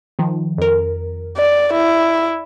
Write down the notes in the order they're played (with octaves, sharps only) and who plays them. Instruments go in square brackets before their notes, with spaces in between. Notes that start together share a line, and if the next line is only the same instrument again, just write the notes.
[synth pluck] D#3 F3
F2 A#4
[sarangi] D5
E4